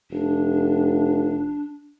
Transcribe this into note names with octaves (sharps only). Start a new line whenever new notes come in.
F1 D4